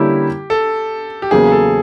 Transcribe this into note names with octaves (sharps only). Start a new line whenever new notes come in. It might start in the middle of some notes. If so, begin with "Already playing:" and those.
Already playing: D3 G3 A#3 C#4 E4 G4
A4
G4
E2 C#3 F#3 A#3 G#4
A4